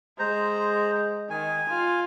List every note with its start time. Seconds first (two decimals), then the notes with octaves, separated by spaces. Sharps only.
0.19 G#3 C5 A#5
1.30 D#3 G#5
1.69 F4